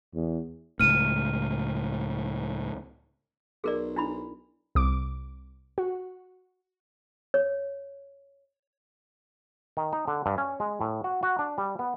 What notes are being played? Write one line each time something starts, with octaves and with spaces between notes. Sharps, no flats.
E2
C#2 A2 F6 D#7
B1 G#4 A#4 D5
D4 E4 B5
C2 D6
F#4
C#5
D#3
D#4
D3
G2
C#4
G#3
A2
F#4
F#4
D4
G3
B3